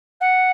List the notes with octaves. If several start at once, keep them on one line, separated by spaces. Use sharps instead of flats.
F#5